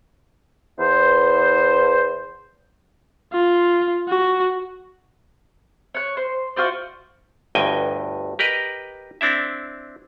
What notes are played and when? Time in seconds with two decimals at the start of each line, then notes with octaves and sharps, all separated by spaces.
0.78 E2 C5
3.32 F4
4.08 F#4
5.94 C#5 F#6
6.17 C5
6.56 F4 F#4 C5 D5
7.55 G1 D2 G2 D#5 G5 G#5
8.39 G4 A#4 B4 D#5
9.21 C4 D4 E4 E5